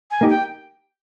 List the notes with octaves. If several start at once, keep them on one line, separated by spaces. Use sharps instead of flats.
G#5
A#3 D#4 G4
G5